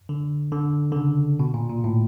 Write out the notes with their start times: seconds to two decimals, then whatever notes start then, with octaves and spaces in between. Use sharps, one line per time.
0.09 D3
0.52 D3
0.92 D3
0.96 C#3
1.39 B2
1.54 A#2
1.69 A#2
1.84 A2